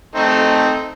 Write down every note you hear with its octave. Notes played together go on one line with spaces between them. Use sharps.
A3 C4 D#4